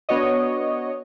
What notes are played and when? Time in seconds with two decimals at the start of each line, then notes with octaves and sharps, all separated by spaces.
0.09 B3 D4 F#4 C#5 D#5